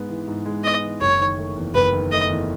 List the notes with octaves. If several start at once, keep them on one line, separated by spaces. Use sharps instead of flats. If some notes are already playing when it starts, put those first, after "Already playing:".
Already playing: G#2 G#3 B3
E3
G#2
G#3
B3 D#5
E3
F#1 C#5
D#3
A3
E2
F#1 B4
D#3
A3 D#5
E2